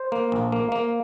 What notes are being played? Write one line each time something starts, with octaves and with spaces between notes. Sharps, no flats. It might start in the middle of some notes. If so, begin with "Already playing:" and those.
Already playing: C5
A#3
A#1
A#3
A#3